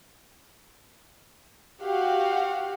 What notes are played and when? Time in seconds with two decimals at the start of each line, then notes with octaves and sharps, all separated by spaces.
1.83 F#4 G4 F5 F#5